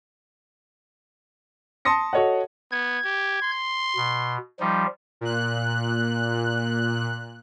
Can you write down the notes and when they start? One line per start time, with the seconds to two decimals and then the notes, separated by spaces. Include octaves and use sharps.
1.85 A5 C6 D#6 A#6 C#7
2.13 F#4 A4 C#5 D#5 F#5
2.71 B3 G#6
3.05 G4
3.42 C6
3.96 B2
4.60 F3 G3 D#4
5.21 A#2 F#6